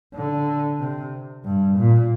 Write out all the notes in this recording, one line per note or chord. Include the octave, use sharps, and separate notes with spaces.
D3
C3
G2
A#2